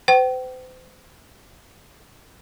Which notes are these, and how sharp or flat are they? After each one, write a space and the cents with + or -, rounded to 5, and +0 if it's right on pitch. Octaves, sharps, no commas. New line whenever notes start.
C5 -40 G5 -35